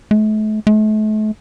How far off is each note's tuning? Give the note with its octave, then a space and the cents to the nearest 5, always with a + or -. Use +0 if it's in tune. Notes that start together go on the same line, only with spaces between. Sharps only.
A3 -40
A3 -40